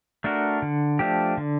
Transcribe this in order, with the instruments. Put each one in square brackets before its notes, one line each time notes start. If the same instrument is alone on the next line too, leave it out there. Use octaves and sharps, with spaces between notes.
[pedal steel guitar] A3 D4 F#4 A#4
D3
F3 A3 D4 G4
D3